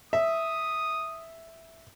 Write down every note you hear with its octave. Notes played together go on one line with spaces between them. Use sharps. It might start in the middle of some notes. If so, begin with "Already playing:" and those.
E5 D#6